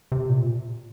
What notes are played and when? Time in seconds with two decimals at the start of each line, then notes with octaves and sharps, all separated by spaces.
0.12 C3
0.29 A#2